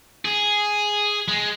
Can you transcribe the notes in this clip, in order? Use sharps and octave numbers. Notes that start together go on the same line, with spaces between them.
G#4
G#3